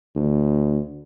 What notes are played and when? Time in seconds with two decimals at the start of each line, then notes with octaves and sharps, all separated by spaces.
0.16 D2